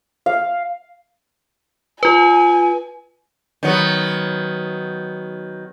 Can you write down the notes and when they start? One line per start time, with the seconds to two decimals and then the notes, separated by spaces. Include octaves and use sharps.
0.26 F5
2.03 F4 B4 G#5
3.63 D#3 F#3 B3